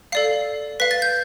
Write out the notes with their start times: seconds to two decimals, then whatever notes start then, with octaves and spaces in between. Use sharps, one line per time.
0.12 A4 D5 F5 C7
0.80 B4 F5 B6
0.91 A6
1.02 G6